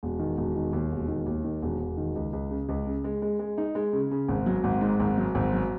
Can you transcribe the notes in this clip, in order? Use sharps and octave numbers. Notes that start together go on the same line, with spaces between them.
E1
D#3
E1
D#3
D#2
E1
D#3
D#2
D#3
E1
E1
D#3
C#2
C#2
C#3
C#2
C#3
G#3
G#3
G#3
D#4
G#3
C#3
C#3
G#1
F#3
G#1
G#2
G#1
F#3
G#1
F#3